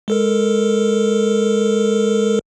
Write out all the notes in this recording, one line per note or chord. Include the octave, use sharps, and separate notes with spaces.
G#3 A4 A#4